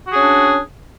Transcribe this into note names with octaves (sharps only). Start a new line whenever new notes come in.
C#4 D4 F#4 G#4